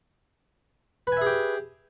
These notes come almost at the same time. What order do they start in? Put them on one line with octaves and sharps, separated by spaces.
B4 G#5 E5 G#4 G4